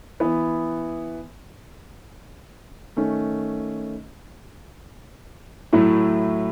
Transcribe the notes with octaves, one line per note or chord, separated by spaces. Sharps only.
E3 B3 E4
D#3 A3 C#4
A2 F#3 A3 E4